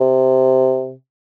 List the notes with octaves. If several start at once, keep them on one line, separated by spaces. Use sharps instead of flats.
C3